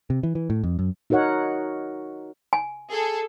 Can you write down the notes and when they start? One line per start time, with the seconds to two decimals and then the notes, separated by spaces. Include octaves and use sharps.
0.10 C3
0.23 E3
0.35 E3
0.50 A2
0.64 F2
0.79 F#2
1.10 D#4 F#4 A#4 C#5 F#5
2.53 G#5
2.91 G#4 A4